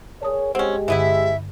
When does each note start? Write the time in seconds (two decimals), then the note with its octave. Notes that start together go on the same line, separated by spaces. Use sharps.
0.21 G#4 A#4 C#5 D5 A5 D#6
0.55 G#3 C4 C#4 G4 F#5
0.88 G2 D3 E3 B3 E4 E5